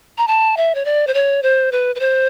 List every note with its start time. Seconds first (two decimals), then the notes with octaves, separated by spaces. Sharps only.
0.18 A#5
0.27 A5
0.57 E5
0.75 C#5
0.85 D5
1.07 C5
1.14 C#5
1.43 C5
1.72 B4
1.95 B4
2.00 C5